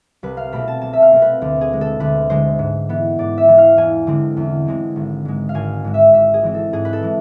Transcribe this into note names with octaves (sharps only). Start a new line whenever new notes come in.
C2 B4
F5
B2 A3 C4 B5
A5
C2 A5
E5
F5
B2 A3 C4
B4
D2
G#4
D3 G#3
A4
D2 B4
D3 G#3 C5
G#2
E3 B3
G#2 D5
E5
E3 B3
F5
E2 G#5
D3 G#3 C4
E2
D3 G#3 C4
G#1
G#2 G#3
F5
G#1 G#5
G#2 G#3
E5
G#2 E5
G#4
E3 G#3 C4
A4
G#2 G#4
B4
A4
E3 G#3